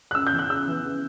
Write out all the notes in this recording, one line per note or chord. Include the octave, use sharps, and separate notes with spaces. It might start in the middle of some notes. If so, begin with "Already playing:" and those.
F#6
C#3 E6
G6
E3 B3
F#6
C#3 E6
E3 B3
C#3